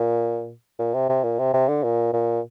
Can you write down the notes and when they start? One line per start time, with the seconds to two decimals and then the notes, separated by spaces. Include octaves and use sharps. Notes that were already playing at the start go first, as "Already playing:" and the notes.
Already playing: A#2
0.79 A#2
0.94 C3
1.09 C3
1.24 A#2
1.39 C3
1.54 C3
1.69 D3
1.84 A#2
2.13 A#2